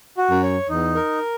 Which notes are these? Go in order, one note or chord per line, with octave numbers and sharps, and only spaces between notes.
F#4
F#2
C#5
E2 D#4
A#4